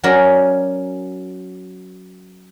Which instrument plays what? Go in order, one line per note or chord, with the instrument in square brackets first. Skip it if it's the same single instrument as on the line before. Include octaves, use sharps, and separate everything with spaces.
[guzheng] F#3 C#4 F#4 A#4 C#5 D5